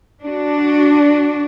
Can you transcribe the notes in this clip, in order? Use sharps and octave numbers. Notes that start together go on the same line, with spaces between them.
D4 F#4